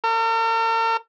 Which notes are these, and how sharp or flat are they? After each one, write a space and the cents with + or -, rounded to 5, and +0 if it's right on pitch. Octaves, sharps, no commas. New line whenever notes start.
A#4 -45